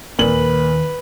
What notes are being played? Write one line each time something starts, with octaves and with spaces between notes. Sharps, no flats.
D#2 A#2 D#3 B4 F#7